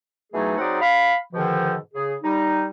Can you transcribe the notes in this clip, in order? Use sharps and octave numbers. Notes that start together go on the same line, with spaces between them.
B2 E3 F#3 A3 D#4 G#4
F#3 C4 D#4 G#4 D5 F#5
F5 B5
G#2 B2 D3 D#3 F3
C#3 G#4
G3 D#4